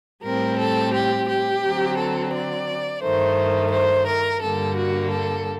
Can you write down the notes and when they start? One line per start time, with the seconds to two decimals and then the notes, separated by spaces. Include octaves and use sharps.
0.24 A2 G3 C4 A#4
0.59 A4
0.94 G4
1.29 G4
1.64 D3 F#3 C4
1.98 A4
2.33 D5
3.03 G2 D#3 A3 C5
3.72 C5
4.08 A#4
4.42 G2 D3 G3 A#3 A4
4.77 F#4
5.12 A4